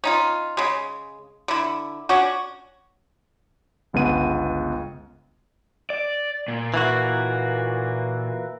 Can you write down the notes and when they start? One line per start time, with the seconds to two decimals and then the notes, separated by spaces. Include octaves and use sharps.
0.04 C#4 D#4 F4
0.57 C#3 G#3
1.48 D3 E4
2.09 C#4 D4 F#4
3.93 G1 C#2 C#3 B3 D#7
5.90 D5
6.48 A#2
6.74 E3 A#3 F#4